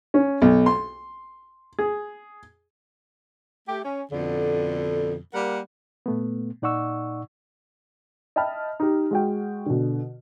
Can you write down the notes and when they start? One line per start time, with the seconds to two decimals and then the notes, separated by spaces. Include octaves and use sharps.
0.14 C#4
0.42 B1
0.66 C6
1.79 G#4
3.68 A3 G4
3.85 C#4
4.12 F2 B2 D3
5.34 G3 A#3 A#4 F#5
6.06 A#2 A3 B3
6.62 A#2 D#4 D5 F#5 C#6 E6
8.36 D#5 E5 G5 A5 B5 F6
8.80 D#4 G4
9.11 G#3 F#4 G5
9.66 B2 D3